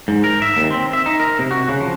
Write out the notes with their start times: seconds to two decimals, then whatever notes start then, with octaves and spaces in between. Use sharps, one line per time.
0.08 G#2
0.24 A#4
0.42 E5
0.57 D#2
0.71 C4
0.93 E5
1.06 D#4
1.19 A#4
1.39 C3
1.51 F#4
1.68 C#3
1.80 F3